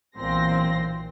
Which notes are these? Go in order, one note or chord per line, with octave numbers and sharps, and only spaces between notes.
B1 A#2 E3 C4 C6 A#6